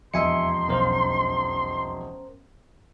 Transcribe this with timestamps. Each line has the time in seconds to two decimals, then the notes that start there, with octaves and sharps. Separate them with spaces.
0.14 E1 F2 D#5 E5 G#5 C6 C#7
0.69 B1 C#4 A#4 C5 F5